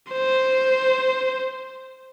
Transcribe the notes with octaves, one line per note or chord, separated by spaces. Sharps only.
C5